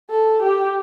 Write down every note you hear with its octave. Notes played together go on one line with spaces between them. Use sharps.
A4
G4